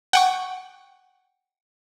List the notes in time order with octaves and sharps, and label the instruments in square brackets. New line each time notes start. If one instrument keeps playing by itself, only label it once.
[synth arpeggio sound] F#5 G5 C#6